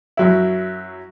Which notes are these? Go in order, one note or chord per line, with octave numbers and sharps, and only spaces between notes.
F#2 F#3 E4